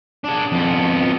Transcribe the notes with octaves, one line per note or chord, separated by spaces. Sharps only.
D4 G#4
F2 B3